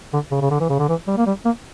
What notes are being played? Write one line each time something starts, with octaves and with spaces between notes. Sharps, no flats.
D3
C#3
C#3
D3
E3
C#3
D3
E3
G3
A#3
G3
A#3